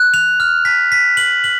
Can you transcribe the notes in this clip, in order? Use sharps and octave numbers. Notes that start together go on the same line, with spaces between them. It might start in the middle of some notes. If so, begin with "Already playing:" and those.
Already playing: F#6
F7
F6
B6
B6
F#7
F#7